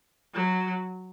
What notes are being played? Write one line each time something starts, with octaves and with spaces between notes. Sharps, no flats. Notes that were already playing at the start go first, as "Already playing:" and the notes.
F#3